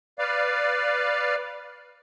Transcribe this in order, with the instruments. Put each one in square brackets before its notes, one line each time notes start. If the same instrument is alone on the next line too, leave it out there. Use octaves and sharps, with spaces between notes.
[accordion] B4 D5 F5